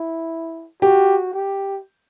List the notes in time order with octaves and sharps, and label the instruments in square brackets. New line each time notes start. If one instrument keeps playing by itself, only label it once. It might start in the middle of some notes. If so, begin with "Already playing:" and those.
Already playing: [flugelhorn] E4
[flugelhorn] F#4 [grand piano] G4
[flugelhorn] G4